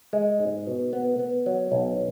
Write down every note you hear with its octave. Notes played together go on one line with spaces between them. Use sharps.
G#3
G#2
B2
B3
B3
F#3
B1